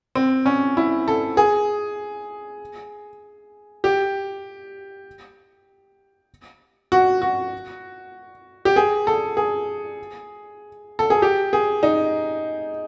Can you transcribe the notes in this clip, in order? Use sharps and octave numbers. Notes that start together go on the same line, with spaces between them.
C4
C#4
E4
A4
G#4
G4
F#4
F#4
G4
G#4
A4
G#4
A4
G#4
G4
G#4
D#4